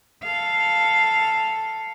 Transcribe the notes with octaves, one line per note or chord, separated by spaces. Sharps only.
A4 F5